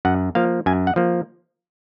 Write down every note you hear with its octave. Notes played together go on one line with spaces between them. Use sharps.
F#2 F#5
F3 A#3 F5
F#2 G#5
F#5
F3 A#3